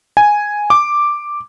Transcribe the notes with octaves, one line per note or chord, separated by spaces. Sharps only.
G#5
D6